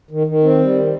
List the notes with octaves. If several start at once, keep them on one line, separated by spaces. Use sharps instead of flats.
D#3
D#3
C4
G3
D#3